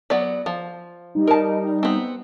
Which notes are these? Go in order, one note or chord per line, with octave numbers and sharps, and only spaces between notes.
F#3 B3 D5
F3
G3 D#4
A#4 A5
B3 C4